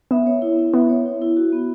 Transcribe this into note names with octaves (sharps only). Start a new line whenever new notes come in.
B3 E5
C#5
E4
E4
B3 E5
C#5
E4
E4
F#4
B3